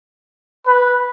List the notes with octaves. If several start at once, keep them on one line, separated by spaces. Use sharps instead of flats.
B4